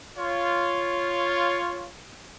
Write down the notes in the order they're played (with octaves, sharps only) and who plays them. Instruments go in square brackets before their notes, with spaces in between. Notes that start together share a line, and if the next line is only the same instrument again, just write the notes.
[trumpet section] F4 C#5